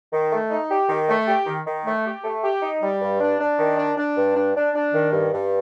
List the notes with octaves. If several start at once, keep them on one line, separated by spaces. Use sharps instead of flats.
D#3
A3
D#4
G4
D#3
A3
G4
D#3
D#3
A3
G4
A3
G4
D#4
G3
G2
D4
D4
D#3
D4
D4
G2
D4
D4
D4
D#3
G2
G2